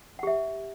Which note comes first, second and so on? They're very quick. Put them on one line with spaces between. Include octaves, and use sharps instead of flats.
F#5 G4 E5